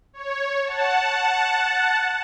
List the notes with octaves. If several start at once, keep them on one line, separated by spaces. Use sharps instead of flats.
C#5
F#5 A5